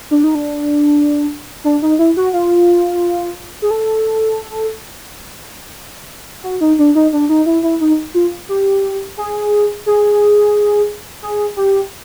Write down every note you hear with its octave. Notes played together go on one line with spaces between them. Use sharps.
D4
D#4
D4
D4
D#4
E4
F#4
F4
G#4
A4
F#4
D#4
D4
D#4
D4
D#4
E4
E4
D#4
F4
G4
G#4
G#4
G#4
G4